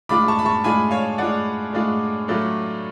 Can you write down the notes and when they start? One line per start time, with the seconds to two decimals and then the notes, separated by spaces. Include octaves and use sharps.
0.09 A2 G#3 D4 F4 B5 D6
0.28 A5 C#6
0.39 B5
0.46 A5 C#6
0.64 A2 G#3 D4 F4 G#5 B5
0.91 C#5 F5
1.18 A2 G#3 D4 F4 D5 F#5
1.73 A2 G#3 D4 F4
2.28 A2 F#3 A3 D4 F4